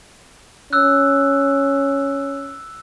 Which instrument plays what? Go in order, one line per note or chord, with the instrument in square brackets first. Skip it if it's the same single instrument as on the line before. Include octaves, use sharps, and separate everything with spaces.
[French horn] C#4 [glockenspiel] E6 F#6